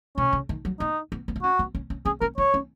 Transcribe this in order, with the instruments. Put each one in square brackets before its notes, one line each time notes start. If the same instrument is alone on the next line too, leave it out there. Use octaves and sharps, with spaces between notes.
[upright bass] B2 [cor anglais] C#4
[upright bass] C#3
D#3
F#3
[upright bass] B3 [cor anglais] D#4
[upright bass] B3
B3
D#4
[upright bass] C#4 [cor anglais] F#4
[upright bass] B3
C#4
C#4
[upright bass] C#4 [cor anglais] G#4
[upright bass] C#4 [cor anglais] A#4
[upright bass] D#4 [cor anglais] C#5
[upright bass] C#4